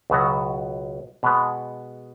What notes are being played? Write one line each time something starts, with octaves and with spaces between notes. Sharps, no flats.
C#2 B2 F#3 B3 F#4
B2 G#3 B3